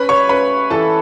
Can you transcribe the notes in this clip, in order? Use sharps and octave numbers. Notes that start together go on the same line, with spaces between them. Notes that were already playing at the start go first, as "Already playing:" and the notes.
Already playing: C#4 B4 B5
C#5 C#6
C#4 B4 B5
E3 A4 A5